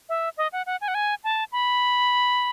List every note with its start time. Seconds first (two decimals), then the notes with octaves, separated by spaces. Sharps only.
0.09 E5
0.37 D#5
0.53 F#5
0.66 F#5
0.81 G#5
0.88 F#5
0.95 G#5
1.24 A5
1.52 B5